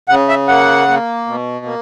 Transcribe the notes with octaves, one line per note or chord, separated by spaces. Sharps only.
C#3 F#5
E5
A#3 F#5
A#3
B2
A#3